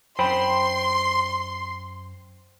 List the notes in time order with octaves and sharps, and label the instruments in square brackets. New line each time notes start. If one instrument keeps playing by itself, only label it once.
[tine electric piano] F#2 [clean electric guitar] C5 G5 B5 [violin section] C6